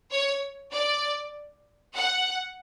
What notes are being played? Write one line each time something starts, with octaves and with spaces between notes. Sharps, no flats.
C#5
D5
F#5